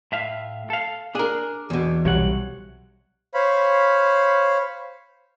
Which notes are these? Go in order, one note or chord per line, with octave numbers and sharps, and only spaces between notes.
A2 E5 F5
A4 F5
D4 G#4 A#4
E2 B2
B1 C3 G3 C#5 F#5
C5 C#5 F5 B5